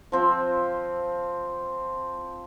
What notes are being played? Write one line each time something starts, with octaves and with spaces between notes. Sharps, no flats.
F3 C4 F4